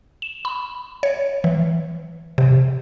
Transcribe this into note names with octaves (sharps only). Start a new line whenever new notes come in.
E7
B5
C#5
E3
C3